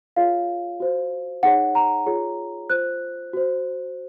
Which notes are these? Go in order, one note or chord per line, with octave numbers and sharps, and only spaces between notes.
F4 G#4 C#5 F5
F#4 C5
D#4 G#4 C#5 F#5
A#5
F4 G#4 C#5
F4 C5 F#6
F#4 C5